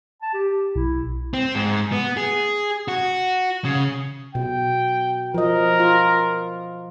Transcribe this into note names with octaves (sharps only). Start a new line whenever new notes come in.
A5
G4
B1 E4
C4
G#2
B3
G#4
F#4
C#3
B2 G5
F3 A#4 D#5
F4